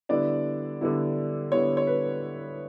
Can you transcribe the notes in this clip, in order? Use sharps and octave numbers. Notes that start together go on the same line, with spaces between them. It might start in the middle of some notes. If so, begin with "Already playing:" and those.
D3 G3 B3 D4 E4 D5
D3 G3 B3 E4
D3 G3 B3 E4 C#5
C#5
B4